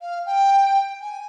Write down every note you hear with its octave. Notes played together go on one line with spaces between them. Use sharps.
F5
G5
G#5